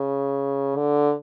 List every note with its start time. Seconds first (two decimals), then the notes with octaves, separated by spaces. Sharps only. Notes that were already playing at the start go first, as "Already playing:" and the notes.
Already playing: C#3
0.76 D3